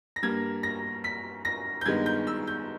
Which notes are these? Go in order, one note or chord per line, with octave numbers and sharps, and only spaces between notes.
A#6
G2 G3 A#3 G#6
A#6
B6
A#6
G6
G2 D#3 G#3 B3 G#6
G6
E6
G6